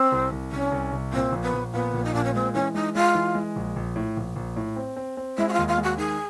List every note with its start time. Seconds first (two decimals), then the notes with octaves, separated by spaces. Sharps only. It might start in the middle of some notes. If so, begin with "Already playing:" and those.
Already playing: C4
0.12 C2
0.32 C2
0.51 C2 C#4
0.72 C2
0.92 C2
1.13 A#2 C4
1.32 A#1
1.42 B3
1.53 A#1
1.73 A#2 B3
1.94 A#1
2.04 D#4
2.14 A#2 D4
2.24 C#4
2.34 G#3 C4
2.54 E3 C#4
2.74 G#3 D#4
2.95 G#3 F4
3.15 E3
3.35 G#3
3.56 A#1
3.76 A#1
3.96 A2
4.17 A#1
4.36 A#1
4.56 A2
4.76 C4
4.96 C4
5.17 C4
5.37 G#3 E4
5.48 F#4
5.53 F4
5.58 D#2
5.68 F4
5.78 G#3
5.83 F#4
5.98 D#3 G#4